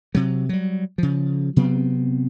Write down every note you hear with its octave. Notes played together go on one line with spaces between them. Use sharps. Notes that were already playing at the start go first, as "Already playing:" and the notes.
C3 F#3
F#3 G3
C#3 F3
C3 F#3 B3 C4